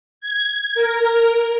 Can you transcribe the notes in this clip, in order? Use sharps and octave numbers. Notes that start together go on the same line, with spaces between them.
G#6
A#4